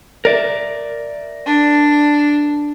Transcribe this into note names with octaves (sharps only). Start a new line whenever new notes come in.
A#4 D5 E5
D4